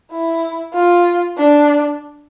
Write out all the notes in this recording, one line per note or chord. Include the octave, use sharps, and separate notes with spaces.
E4
F4
D4